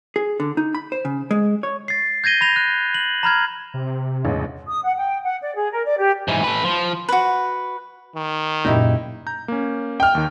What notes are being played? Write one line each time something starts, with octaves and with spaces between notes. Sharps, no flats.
G#4
D3
D#4
B5
C5
C#3
G#3
C#5
A6 C7
G6 G#6 A#6 D#7 G7
B5 A#6 F7
F#6
F#7
A#5 B5 F6 G#6
C3
A1 E2 C#3 G#3
D#6
F#5
G5
F#5
D5
G#4
A#4
D5
G4
G#2 E3
A3 B4
F3
F#4 B4
D#3
F#1 A#2 D#4 E4 G4 D#5
A#5 G6
A#3 C#4
G5 F6
D#2 D#3